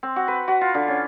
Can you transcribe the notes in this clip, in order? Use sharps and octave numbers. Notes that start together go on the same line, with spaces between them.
C4
F#4
B4
F#4
F4
D3
C#4